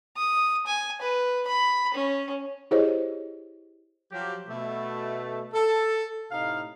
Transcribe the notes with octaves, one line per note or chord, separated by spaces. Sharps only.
D#6
G#5
B4
B5
C#4
E4 G4 G#4 C5 C#5 D#5
F3 F#3 G4
B2 A3
A4
A2 C3 D#4 F5